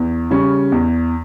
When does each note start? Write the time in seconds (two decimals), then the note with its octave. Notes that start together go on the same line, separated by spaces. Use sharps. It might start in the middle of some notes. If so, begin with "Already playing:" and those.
Already playing: E2
0.30 C#3 G3 C#4
0.72 E2